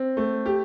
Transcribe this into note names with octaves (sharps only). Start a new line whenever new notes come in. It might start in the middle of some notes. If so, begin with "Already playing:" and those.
Already playing: C4
A3
G4